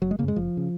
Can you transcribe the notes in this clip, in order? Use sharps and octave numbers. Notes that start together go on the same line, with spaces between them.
F#1 F#3
G#3
F#2 C#3 G#3 A#3
F#1 F3
C#3